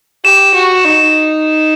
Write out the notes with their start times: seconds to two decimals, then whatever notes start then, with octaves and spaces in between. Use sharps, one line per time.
0.25 G4 E7
0.54 F#4
0.85 D#4